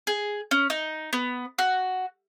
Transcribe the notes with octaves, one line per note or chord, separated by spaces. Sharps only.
G#4
C#4
D#4
B3
F#4